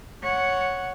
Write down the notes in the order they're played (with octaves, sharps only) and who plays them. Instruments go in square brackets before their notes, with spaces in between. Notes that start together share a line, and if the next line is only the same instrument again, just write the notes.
[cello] C#5 F#5